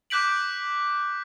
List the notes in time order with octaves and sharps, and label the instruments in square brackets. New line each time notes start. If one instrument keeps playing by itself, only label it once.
[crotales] D6 F#6 G6 B6 D7 F#7